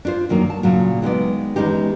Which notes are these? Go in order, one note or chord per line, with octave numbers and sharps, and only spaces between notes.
D4 E4 F4 C5
F#2 D#3 F#3 A#3
A5
A#2 C#3 F#3
D#3 G#3 B3 D5
E2 G#2 G#3 C#4 D#4 G4